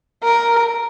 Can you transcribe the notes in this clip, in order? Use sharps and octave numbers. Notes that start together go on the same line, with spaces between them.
A#4